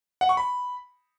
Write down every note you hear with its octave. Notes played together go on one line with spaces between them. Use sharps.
F#5
C#6
B5